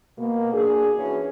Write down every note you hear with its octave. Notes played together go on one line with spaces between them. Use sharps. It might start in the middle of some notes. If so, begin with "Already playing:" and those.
B2 A#3
D4 F#4 G#4
E3 C#4 F#4